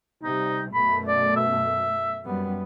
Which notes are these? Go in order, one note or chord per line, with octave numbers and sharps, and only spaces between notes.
C3 G3 D#4
F#2 B2 A3 B5
D5
E5
F#2 G3 B3